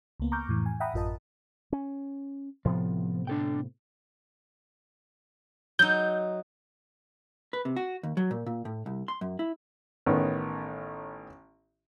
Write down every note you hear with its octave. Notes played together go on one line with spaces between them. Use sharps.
C#2 A#3 B3
A#5 C#6 D6 F6 G6
F2 A2 E3
G#5
E5 F#5 G5 A#5 B5 D#6
A1 F#2 F4 A#4 D#5 A5
C#4
A2 C3 F3 B3
D4 A4 G5
F#3 D#4 G6
B4
C3
F#4
D#2
F#3
A#2
A#2
A2
C2
C6
F#2
E4
A1 D#3 B3 C#4